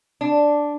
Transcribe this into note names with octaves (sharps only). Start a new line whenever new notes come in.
D4